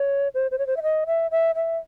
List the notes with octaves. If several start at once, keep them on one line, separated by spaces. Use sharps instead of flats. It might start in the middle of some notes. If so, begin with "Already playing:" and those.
Already playing: C#5
C5
C5
C#5
C5
E5
D#5
E5
E5
E5